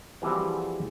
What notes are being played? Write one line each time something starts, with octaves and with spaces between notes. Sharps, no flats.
E3 F3 G3 C4 F#4 G#4